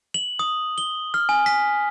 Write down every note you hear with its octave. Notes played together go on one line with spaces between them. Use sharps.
F#7
D#6
G7
F6
G#5
B6